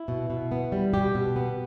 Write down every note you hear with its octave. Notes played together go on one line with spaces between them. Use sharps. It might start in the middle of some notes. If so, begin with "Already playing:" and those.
Already playing: E4
B2
B2
B3
G3
B2 G4
B2
B3